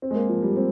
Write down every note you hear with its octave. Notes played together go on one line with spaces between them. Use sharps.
C4
G#3
A#3
F3
G3
C4